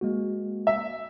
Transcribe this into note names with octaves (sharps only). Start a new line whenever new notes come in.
G#3 A#3 F#4
E5